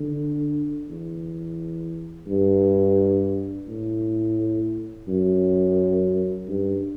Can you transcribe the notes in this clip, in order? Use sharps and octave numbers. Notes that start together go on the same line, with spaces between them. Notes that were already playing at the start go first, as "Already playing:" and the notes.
Already playing: D3
E2
G2
A2
F#2
G2